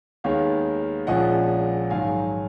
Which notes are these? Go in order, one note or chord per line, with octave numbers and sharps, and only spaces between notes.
D#2 D#3 G#3 B3 C#5 F5
A#1 A#2 F3 G#3 C#4 D#5 F#5
G#2 D#3 F#3 F5 G#5